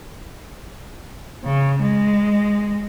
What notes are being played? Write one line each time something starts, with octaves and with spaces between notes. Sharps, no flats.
C#3
G#3